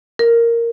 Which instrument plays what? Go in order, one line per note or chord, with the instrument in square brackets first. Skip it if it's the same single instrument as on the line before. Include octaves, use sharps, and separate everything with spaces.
[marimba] A#4